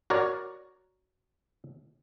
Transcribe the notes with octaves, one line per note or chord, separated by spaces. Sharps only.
F#4 A#4 C#5 D5